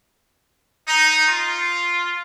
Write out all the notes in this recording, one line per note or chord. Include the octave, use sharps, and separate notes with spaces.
D#4
F4